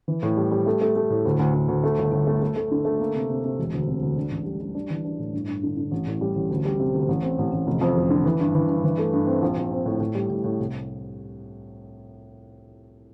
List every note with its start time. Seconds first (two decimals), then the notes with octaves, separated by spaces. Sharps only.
0.08 E3
0.23 A2
0.37 G3
0.51 G3
0.66 A3
0.81 A3
0.96 A3
1.10 A2
1.25 D2
1.39 D2
1.54 D2
1.68 D2
1.84 A3
1.98 G1
2.12 G1
2.27 A3
2.42 A3
2.56 A3
2.71 D3
2.85 A3
3.00 A#3
3.15 C3
3.29 C3
3.44 C3
3.59 E1
3.73 D2
3.88 C3
4.02 D2
4.17 D4
4.31 A1
4.45 G3
4.61 G3
4.75 D4
4.90 E3
5.04 D4
5.19 A2
5.34 G2
5.48 G2
5.63 D3
5.77 D3
5.91 A1
6.07 A2
6.21 G3
6.35 A1
6.50 D2
6.65 G3
6.80 C3
6.94 D2
7.08 A1
7.23 C4
7.38 A1
7.52 A1
7.67 F1
7.81 F2
7.96 F1
8.10 D3
8.25 E3
8.40 G2
8.55 E3
8.69 G2
8.84 E3
8.98 A3
9.13 G2
9.27 C4
9.42 A#1
9.57 A#1
9.71 C4
9.86 A2
10.00 A2
10.15 G3
10.30 A2
10.44 A2
10.59 C2